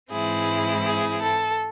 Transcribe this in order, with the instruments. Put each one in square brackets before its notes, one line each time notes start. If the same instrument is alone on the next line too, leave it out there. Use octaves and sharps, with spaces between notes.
[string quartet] G#2 E3 G#3 C4 E4 G#4
G#4
A4